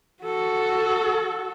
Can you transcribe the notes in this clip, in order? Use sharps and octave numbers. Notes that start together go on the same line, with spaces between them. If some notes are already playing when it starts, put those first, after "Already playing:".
F#4 A4